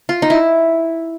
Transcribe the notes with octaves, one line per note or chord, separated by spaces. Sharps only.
F4
D#4
E4